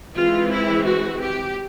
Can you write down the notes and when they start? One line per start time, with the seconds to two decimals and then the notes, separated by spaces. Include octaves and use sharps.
0.16 E3 G#3 C4 F4
0.51 E4
0.86 F#4
1.20 G4